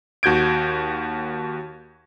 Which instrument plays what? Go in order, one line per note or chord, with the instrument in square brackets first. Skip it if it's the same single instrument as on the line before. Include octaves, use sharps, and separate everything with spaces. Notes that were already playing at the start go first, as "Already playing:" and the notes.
[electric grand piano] D#2 F#4 G6 G#6 D7